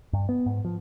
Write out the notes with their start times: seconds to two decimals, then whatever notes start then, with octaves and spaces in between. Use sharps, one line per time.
0.13 G2
0.29 B3
0.46 G#2
0.65 F3